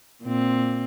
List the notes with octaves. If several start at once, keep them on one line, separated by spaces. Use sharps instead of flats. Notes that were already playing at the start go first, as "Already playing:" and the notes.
A#2 C4